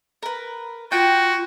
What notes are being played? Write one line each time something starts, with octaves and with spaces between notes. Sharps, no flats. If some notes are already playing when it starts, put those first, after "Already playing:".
A#4 B4
F4 F#4 G5